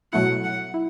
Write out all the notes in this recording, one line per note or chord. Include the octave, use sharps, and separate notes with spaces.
B2 F#3 A3 E4 F#5
F#5
E4